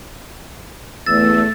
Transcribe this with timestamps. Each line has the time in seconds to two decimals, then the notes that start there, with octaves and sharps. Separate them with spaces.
1.06 E2 A3 E6 A6